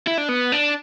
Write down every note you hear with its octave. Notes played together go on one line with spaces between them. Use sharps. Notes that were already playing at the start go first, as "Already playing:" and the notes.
E4
D4
B3
D4